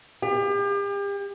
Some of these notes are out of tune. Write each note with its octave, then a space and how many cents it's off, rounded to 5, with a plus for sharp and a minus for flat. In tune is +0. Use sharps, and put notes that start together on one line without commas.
G4 +40